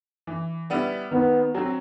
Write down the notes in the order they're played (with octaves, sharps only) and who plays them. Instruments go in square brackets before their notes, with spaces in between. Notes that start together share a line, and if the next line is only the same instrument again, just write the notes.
[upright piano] E3
G3 B3 E4
[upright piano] D#3 [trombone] B3
[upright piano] F#3 C4